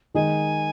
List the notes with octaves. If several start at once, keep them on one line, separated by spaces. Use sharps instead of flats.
D#3 G#3 D#4 G#5